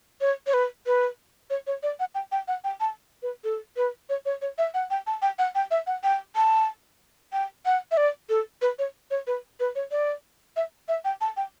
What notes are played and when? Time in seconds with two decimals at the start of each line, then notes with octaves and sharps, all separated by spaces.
0.21 C#5
0.47 C#5
0.54 B4
0.87 B4
1.50 C#5
1.67 C#5
1.83 D5
2.00 F#5
2.15 G5
2.32 G5
2.48 F#5
2.64 G5
2.80 A5
3.23 B4
3.44 A4
3.77 B4
4.09 C#5
4.26 C#5
4.42 C#5
4.58 E5
4.74 F#5
4.91 G5
5.07 A5
5.22 G5
5.39 F#5
5.55 G5
5.71 E5
5.87 F#5
6.04 G5
6.36 A5
7.33 G5
7.66 F#5
7.91 E5
7.97 D5
8.29 A4
8.62 B4
8.79 C#5
9.11 C#5
9.27 B4
9.60 B4
9.75 C#5
9.91 D5
10.56 E5
10.88 E5
11.05 G5
11.21 A5
11.37 G5